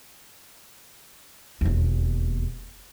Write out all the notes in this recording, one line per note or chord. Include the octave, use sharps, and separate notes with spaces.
E1 D#2